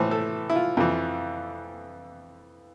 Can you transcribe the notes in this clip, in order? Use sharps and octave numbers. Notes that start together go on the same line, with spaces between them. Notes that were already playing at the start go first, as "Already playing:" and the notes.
Already playing: A2 E3 C5
A4
E4
F4
F2 E3